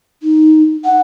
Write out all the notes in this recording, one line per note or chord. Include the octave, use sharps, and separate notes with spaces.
D#4
F#5